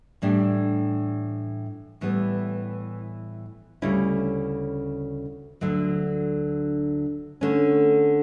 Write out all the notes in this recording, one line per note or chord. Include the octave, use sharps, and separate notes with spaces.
A2 E3 G3 D4 G4
A2 E3 G3 B3
D2 C#3 G3 C#4 E4
D2 D3 F#3
D3 A3 C#4